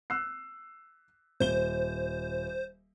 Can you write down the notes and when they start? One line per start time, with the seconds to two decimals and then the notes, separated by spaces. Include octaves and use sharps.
0.10 E6 F#6 C7
1.40 D#1 C5 G7